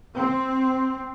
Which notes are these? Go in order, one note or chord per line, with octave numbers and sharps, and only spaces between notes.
C4